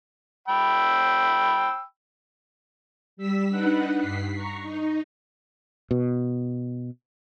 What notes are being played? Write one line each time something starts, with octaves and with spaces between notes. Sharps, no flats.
G5 B5 E6
G3 E6 B6
D4 D#4 B4 F#5 F#6
G2 B6 C7
A#5 C#6
D#4
B2